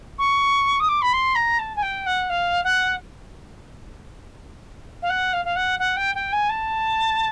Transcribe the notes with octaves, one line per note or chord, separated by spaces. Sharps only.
C#6
D#6
D6
B5
C6
A#5
A5
G#5
G5
F#5
F5
F#5
F5
F#5
F5
F5
F#5
F#5
G5
G5
G#5
A5